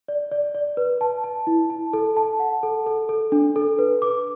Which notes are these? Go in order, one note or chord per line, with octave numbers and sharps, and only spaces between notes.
D5
D5
D5
B4
A5
A5
E4
A5
A4
A5
F#5
A4
A4
A4
D4
A4
B4
D6